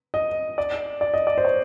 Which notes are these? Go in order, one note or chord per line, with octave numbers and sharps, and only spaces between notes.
D#5
D5
D5
D#5
D5
C5
C#5